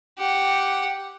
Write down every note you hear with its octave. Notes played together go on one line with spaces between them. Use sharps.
G4 F#5